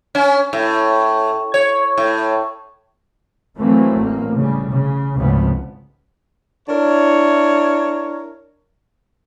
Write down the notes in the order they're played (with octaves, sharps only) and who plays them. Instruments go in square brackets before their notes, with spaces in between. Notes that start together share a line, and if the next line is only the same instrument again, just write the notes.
[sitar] C#4
A2
C#5
A2
[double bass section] E3 F#3 A3 A#3 C4
A1 A#3
C#3 G3
C#3
G#1 C#2 A2 C#3 F3 B3
[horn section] D4 E4 A#4 C#5